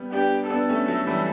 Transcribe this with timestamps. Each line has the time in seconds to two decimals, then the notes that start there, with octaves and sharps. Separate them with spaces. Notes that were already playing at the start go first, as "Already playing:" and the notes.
Already playing: G3 B3
0.12 B3 D4 G4
0.50 B3 D4 A4
0.69 A3 C#4
0.88 F#3 A3
1.07 E3 G3